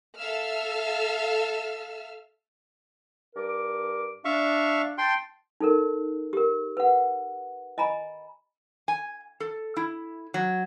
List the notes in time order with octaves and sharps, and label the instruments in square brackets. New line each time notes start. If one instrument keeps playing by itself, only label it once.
[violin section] A4 E5 F5 E6 F6
[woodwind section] G2 A#4 D6
[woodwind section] D4 [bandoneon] E5 F5 C#6
[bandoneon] G5 C6 [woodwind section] A5
[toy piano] D#4 A4 A#4
G4 A#4
B4 F#5
D#5 G#5 A#5 B5
[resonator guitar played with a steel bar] G#5
A4
E4
F#3